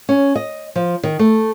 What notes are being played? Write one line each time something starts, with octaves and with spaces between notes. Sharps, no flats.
C#4
D#5
F3
D#3
A3